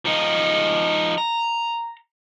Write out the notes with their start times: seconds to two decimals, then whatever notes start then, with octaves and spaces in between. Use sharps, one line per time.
0.05 F3 D#4
1.18 A#5